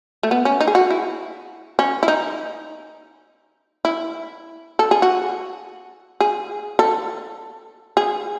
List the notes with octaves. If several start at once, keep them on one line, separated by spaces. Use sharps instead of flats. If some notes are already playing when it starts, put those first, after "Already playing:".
A3
B3
C#4
D#4
G#4
F#4
E4
C#4
E4
D#4
E4
A4
G#4
F#4
G#4
A4
G#4